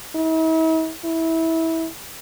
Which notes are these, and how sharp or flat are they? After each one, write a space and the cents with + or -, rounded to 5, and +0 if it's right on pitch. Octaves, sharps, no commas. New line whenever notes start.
E4 -45
E4 -20